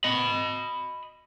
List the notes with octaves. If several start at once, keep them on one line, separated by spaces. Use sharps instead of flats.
D#5 B5